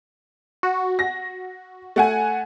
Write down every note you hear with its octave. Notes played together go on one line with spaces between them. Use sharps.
F#4
A#6
A3 F#5 G#5